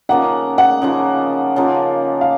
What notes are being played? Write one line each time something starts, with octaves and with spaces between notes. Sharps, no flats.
C#3 F3 A#3 D#4 F#5
F#5
C#3 F3 A#3 D#4
C#3 F3 A#3 D#4
F5